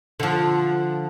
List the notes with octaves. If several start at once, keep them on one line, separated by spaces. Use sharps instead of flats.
D3 F3